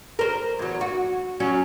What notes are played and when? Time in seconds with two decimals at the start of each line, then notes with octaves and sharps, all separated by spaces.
0.19 A#4 C5
0.59 E2 F#3
0.81 F#4
1.40 F#3 C#4 F#4